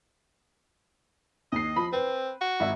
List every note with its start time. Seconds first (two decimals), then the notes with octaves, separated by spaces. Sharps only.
1.52 D#2 D#5 C7
1.76 F3 B5
1.93 C4 B4
2.41 F#4
2.60 G#1 E5